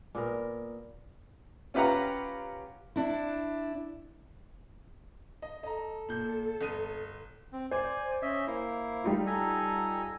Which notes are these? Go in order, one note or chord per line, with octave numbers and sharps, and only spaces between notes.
A#2 B3 A#4
C#4 F4 G4 B4 F#5 A#5
D4 E4
D#5
A4 D#5 A#5
A#2 G6
G1 D#6 D#7
C4
C5 D5 G#5
C#4 D#5 E5
A#3 E4
G3 D#4 F4
A4 G#5 A#5